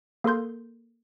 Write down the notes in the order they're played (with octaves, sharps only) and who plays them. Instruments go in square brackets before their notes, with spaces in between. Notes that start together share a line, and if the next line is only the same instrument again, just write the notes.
[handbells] A#3 A4 A#4 C6 G6